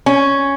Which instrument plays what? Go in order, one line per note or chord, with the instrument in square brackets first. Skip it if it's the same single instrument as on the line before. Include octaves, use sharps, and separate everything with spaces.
[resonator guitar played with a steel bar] C#4